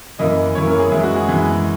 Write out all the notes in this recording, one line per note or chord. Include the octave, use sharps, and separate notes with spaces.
F#2 E3 A#3 D#5
F#2 E3 A#3 C#5
A#4
G#4
F#2 E3 G#3 E4
F#4
G#4
F#2 E3 G#3